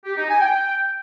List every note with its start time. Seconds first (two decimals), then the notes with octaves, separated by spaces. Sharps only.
0.05 G4
0.17 D#4
0.29 G#5
0.40 G5